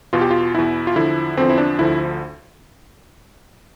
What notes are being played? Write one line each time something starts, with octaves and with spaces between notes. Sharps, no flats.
E2 B2 F4
G4
F4
E2 B2 E4
F4
E2 D3 F3 E4
E2 D3 F3 C4
E4
D4
D2 D3 F3 E4